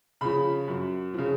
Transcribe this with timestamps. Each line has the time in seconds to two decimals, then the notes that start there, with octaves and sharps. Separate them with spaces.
0.21 C#3 F3 B5
0.68 F#2
1.14 C#3 F3